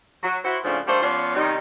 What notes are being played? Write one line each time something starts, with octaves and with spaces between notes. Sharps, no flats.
F#3
E4 F#4 C5
G#2 C#3 F3 A3 C4 D4
G3 A3 A#3 D4 C5
F3 B3 C#4 C5 D5
C3 D#3 G3 D#4